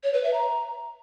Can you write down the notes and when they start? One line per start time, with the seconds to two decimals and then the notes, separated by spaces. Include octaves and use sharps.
0.04 C#5
0.14 B4
0.24 E5
0.34 A#5